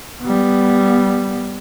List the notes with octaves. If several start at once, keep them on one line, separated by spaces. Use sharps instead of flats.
G3 B3